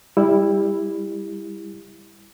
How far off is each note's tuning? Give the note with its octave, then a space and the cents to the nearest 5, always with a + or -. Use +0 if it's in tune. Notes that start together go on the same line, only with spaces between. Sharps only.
G3 +25 E4 +0